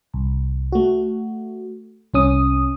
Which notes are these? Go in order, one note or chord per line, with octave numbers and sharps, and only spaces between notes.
C2
A3 F#4
C2 C#4 D#6